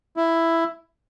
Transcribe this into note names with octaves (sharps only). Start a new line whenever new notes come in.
E4